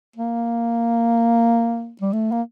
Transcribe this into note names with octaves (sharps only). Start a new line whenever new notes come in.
A#3
G3
A3
A#3